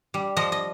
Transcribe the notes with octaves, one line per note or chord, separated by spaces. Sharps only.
G3
F3 D#5
D#5